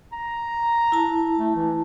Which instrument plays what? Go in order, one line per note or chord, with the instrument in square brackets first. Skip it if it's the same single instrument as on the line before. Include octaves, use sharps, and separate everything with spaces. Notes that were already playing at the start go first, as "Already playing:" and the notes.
[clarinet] A#5
[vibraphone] E4 A5
[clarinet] A3
E3